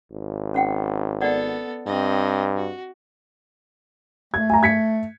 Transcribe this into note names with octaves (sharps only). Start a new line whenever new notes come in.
G#1
C#4 F#5 G5
B3 A4 D5 F#5
G2 C4 D#5
F#4
A3 G#6
G#5 A#5
G#6 B6 C#7